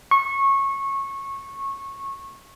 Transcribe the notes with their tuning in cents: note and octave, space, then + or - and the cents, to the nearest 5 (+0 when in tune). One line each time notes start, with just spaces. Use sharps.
C#6 -20